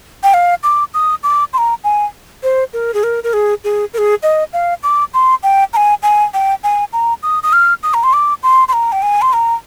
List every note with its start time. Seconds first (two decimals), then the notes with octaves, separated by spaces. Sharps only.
0.23 G5
0.34 F5
0.63 D6
0.94 D#6
1.23 D6
1.53 C6
1.58 A#5
1.84 G#5
2.43 C5
2.73 A#4
2.94 G#4
3.03 A#4
3.24 A#4
3.33 G#4
3.64 G#4
3.94 A#4
3.98 G#4
4.23 D#5
4.53 F5
4.83 D6
5.14 C6
5.43 G5
5.73 A#5
5.76 G#5
6.03 G#5
6.34 G5
6.63 G#5
6.93 A#5
7.23 D#6
7.43 D#6
7.53 F6
7.83 D#6
7.94 A#5
8.03 C6
8.13 D6
8.43 C6
8.68 C6
8.73 A#5
8.92 G5
9.02 G#5
9.22 C6
9.33 A#5